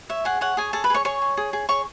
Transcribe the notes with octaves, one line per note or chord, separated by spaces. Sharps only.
C#5 E5
G#4 F#5
C#5 F#5
G#4 C#5 G#5
G#4 A4 A5
B4 B5
G#4 C#5 C#6
G#4 C#5 C#6
G#4
G#4
G#4
G#4 C#5 C#6